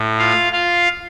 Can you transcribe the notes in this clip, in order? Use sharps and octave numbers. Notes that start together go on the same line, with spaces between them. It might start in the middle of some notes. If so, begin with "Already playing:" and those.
Already playing: A2
F4 F5
F4 F5